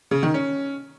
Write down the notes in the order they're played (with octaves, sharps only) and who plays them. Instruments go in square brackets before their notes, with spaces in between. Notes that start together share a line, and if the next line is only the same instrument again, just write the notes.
[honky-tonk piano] C#3
D#3
C#4